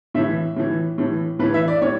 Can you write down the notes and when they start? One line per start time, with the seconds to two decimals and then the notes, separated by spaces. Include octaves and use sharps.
0.14 A2 E3 E5
0.56 A2 E3
0.98 A2 E3
1.39 A2 E3 B4
1.54 E5
1.68 D5
1.82 A2 C#5